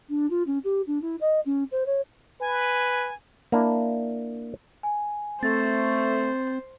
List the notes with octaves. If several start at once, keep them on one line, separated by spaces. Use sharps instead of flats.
D4
F4
C#4
G4
D4
E4
D#5
C#4
C5
C#5
B4 G#5
A#3 D4 E4
G#5
A3 C4 C5 A6